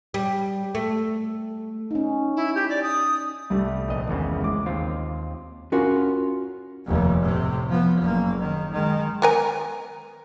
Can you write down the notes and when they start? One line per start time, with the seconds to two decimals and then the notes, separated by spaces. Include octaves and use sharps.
0.14 G3
0.75 A3
1.91 C#4 D#4
2.36 E4
2.55 G4
2.69 D5
2.83 D#6
3.50 C2 G3 A3
3.88 A#1 D#5
4.08 G#1 E2 C#3
4.43 G#3 D6
4.66 D#2 C4 F4
5.72 C#4 F4 F#4 A#4
6.86 F1 D#2
7.22 A2 C3
7.69 F3 B3
8.01 F#1 A#3
8.40 D#3
8.72 D#3 G#3
9.22 B3 A#4 G#5